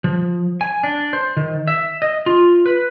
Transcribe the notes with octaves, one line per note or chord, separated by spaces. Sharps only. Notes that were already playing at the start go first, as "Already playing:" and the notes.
F3
G#5
D4
C5
D#3
E5
D#5
F4
B4